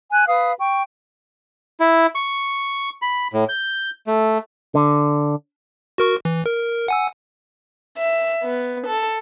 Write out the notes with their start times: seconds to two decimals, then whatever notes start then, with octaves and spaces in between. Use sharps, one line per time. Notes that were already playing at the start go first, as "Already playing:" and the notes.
0.11 G#5 F#6
0.27 B4 F5 D#6
0.59 G5 C#6
1.80 E4
2.15 C#6
3.02 B5
3.33 A2
3.49 G6
4.07 A3
4.75 D3
5.98 F#4 A#4 C#6
6.25 E3
6.46 A#4
6.88 F#5 G#5 E6
7.98 E5
8.43 B3
8.87 A4